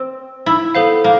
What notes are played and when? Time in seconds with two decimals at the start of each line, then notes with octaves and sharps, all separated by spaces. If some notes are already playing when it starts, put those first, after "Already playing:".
Already playing: C4
0.46 E4
0.75 B3 A4 C5 F5
1.04 A#3